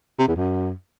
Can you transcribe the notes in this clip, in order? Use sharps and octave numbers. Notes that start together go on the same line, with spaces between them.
C3
E2
F#2